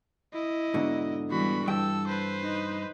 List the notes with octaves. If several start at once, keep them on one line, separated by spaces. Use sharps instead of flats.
E4 D#5
G#2 B2 D3
E3 G3 B3 F#4 B5
G2 A4 G5 E6
B4 C5
D#4